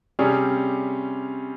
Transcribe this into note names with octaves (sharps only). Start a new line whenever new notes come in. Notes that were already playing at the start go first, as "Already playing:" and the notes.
C3 G3 C#4 G#4